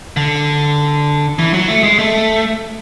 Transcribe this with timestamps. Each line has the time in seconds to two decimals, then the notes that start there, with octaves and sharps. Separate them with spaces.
0.17 D3
1.39 E3
1.54 F#3
1.68 A3
1.83 G#3
1.99 A3